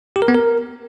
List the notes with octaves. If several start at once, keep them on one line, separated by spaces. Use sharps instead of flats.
G4
A#4
B3
A#4